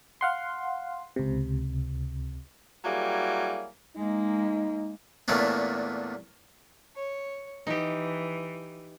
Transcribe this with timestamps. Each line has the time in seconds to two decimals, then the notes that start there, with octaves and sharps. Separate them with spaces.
0.21 F5 F#5 C6
1.16 C#2 C3
2.84 F#3 G3 A#3 E4 G#4
3.96 G#3 A#3 D#4
5.28 E2 A#2 A3 C#4 D4
6.96 C#5
7.67 E3 D#4 G4